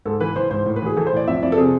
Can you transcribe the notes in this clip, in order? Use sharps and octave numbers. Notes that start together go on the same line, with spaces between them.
G#2 A4
E3 B4
E3 C5
G#2 C5
A2
B4
E3 G#4
E3 A4
C5
A2 D5
F2 E5
F2 D5
A4
C3 G#4